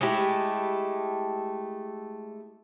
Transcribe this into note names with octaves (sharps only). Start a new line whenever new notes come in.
G#3 A3 E4 G4